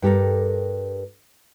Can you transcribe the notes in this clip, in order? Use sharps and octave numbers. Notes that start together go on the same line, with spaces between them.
G2 G4 A4 A#4